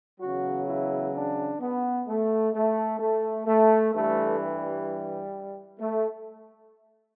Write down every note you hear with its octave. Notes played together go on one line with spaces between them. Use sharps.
E2 C#3 F#3 F#4
E4
D4
B3
A3
A3
A3
A3
G2 E3 G3 A3
G3
A3